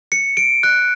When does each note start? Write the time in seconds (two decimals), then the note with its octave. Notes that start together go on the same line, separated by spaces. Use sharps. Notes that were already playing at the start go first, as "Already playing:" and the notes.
0.12 C#7
0.37 D7
0.63 F#6